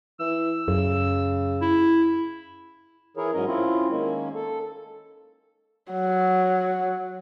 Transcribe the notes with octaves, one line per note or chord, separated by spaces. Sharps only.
E3 E6
F#2 C#3
E4
E3 E4 G#4 A#4 C#5
G#2 F#3 C#4 A#4 D#5
C4 C#4 E4 F4
D#3 G#3 A#3 C#4
A4
F#3